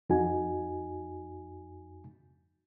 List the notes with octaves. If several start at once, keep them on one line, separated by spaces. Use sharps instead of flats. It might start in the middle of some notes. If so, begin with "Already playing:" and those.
F2 D#4 F#4 G#5